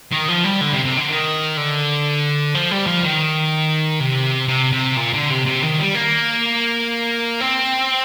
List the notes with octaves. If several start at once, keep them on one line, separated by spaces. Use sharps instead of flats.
D#3
F3
G3
D3
C3
C3
D3
D#3
D3
F3
G3
F3
D#3
C3
C3
C3
A#2
D3
C3
C3
D#3
G3
A#3
C4